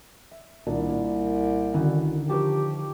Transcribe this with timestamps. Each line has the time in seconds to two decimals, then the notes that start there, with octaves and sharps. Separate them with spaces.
0.31 E5
0.66 C2 A#2 D#3 D4
0.91 A#2
1.73 D3 D#3 C#4 E4 F#4
2.29 F3 G4 A#4 A5 C#6 G6